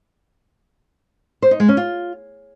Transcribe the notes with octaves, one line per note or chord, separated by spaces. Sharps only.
C5
D#4
G#3
C#4
F4